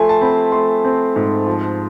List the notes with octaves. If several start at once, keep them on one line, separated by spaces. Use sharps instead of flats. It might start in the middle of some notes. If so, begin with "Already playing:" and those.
Already playing: F3 A3 G#5 C6
A5
C4 B5
A3 C6
C4
G#2
F3